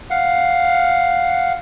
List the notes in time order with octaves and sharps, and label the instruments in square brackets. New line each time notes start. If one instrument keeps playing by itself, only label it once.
[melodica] F5 F#5